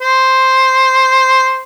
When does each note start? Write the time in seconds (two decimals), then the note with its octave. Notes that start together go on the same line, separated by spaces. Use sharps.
0.02 C5